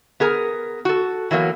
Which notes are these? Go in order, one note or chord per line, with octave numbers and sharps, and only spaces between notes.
B3 G#4 A#4
F#4 A4
E3 F#3 A#3 B3